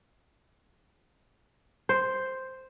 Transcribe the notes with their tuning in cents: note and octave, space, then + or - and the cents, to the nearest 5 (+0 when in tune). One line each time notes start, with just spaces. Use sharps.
C5 +0